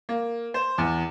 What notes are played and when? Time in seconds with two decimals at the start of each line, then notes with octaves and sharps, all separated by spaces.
0.09 A#3
0.54 C5
0.78 E2